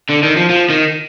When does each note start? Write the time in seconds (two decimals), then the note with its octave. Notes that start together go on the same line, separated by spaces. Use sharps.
0.10 D3
0.23 D#3
0.37 F3
0.50 F3
0.70 D#3